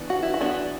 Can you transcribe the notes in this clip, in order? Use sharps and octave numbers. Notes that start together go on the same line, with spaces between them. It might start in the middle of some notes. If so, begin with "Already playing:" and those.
Already playing: E3 B3 D4
F#4
E4
F#4
E3 B3 D4